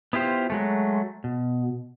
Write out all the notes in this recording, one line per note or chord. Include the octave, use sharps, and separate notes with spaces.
B3 E4 F4 G4 C5
F#3 G#3 A3
B2